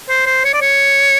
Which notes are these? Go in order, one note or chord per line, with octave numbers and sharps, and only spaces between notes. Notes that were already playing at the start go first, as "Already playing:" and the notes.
C5
C5
C#5
D5
C#5